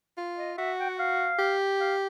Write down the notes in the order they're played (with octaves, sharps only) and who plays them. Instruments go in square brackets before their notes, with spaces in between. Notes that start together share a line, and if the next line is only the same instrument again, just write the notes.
[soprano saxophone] F4
[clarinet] D#5
[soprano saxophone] F#4 [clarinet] E5
[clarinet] G5
F#5
F5
[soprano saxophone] G4
[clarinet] F5